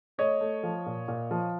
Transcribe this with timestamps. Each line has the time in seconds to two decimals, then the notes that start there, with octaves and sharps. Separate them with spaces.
0.18 A3 C#5 D#5
0.41 A3
0.63 F3
0.86 A#2
1.08 A#2
1.31 F3